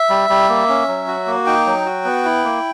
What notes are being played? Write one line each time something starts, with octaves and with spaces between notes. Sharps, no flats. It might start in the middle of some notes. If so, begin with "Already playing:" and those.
Already playing: E5
G3
G3
A#3
C#4
F#3
F#4
A#3
D#4 G5
F#3
F#4
B3
E4
A#3